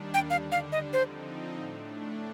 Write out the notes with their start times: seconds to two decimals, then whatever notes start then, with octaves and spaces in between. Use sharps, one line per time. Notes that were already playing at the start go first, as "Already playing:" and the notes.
Already playing: D#2 D#3 G3 D4
0.14 G5
0.30 D3 G3 D4 F5
0.52 F5
0.72 D#5
0.93 D3 F3 C4 D#4 C5
1.57 A2 A3 D4